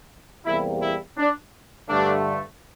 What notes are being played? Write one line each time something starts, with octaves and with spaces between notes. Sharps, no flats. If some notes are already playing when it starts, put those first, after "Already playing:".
E2 C3 G3 A#3 E4
E4
D4
G2 D3 A3 D4